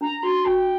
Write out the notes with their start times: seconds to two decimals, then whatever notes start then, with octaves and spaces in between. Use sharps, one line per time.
0.01 D4 A#5
0.23 F#4 C6
0.45 F#4 G5